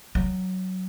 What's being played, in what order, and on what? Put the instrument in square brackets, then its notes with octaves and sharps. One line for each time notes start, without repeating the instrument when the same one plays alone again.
[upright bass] F#3